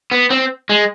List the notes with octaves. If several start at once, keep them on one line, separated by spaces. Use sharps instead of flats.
B3
C4
G#3